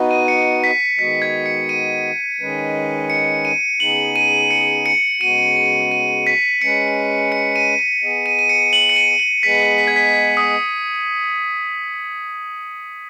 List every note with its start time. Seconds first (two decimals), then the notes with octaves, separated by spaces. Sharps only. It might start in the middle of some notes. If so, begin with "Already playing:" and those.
Already playing: B3 D#4 F#4 B4 D#5
0.11 D#7
0.28 C#7
0.64 B6
0.99 D#3 G#3 B3 F#4 D#5 B6
1.22 G#6
1.46 C#7
1.69 D#7
2.40 D#3 G#3 C#4 B4 D#5
3.10 C#7
3.45 D#7
3.80 C#3 B3 D#4 G#4 F#7
4.16 D#7
4.51 C#7
4.86 C#7
5.21 C#3 G#3 B3 F#4 D#7
5.56 D#7
5.91 D#7
6.27 B6
6.62 G#3 C#4 B4 C#7
7.32 C#7
7.56 D#7
7.79 D#7
8.03 B3 G#4 D#5
8.26 D#7
8.39 D#7
8.49 C#7
8.73 F#7
8.89 C#7
8.96 D#7
9.20 F#7
9.43 G#3 B3 G#4 B4 D#5 B6
9.78 B6
9.88 G#6
9.96 B6
10.13 G#6
10.37 D#6